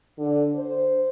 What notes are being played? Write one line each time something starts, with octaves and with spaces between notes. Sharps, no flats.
D3
C5